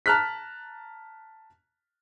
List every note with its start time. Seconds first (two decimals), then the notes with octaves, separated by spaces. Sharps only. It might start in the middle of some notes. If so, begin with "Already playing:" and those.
0.06 A5 A#5 F6 F#6 B6